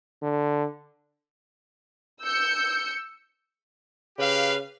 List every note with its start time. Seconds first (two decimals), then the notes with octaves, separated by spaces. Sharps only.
0.22 D3
2.22 E6 G6 C#7
4.18 C#3 G4 B4 F5